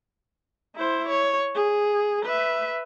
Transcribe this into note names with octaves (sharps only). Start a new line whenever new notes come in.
E4 C5
C#5
G#4
B4 E5